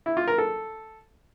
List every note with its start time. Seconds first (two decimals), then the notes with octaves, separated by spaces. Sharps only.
0.06 E4
0.17 F4
0.28 A#4
0.38 A4